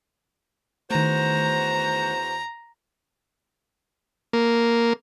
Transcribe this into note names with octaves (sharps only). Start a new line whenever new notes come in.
E2 D#3 A3 F#4 C5 A#5
A#3